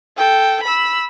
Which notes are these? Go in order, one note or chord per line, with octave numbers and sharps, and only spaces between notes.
A4 G5
B5 E6